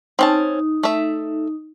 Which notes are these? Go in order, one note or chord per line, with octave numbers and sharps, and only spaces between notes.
C4 C#4 D#4 A5
A3 E5